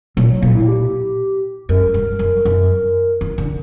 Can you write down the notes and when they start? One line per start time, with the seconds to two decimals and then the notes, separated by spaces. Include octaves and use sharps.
0.16 A#2 F#3
0.30 F#3
0.42 A#2 A#3
0.55 E4
0.68 G4
1.69 F#2 A#4
1.94 G2
2.19 F#2
2.45 F#2
3.21 E3
3.38 D3